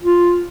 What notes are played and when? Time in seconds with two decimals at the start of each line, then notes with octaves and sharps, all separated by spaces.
0.03 F4